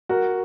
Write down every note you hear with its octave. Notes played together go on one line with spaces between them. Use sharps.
F#4 A#4